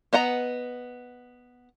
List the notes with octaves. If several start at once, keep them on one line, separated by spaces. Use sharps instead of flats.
B3 D#5 F#5 A#5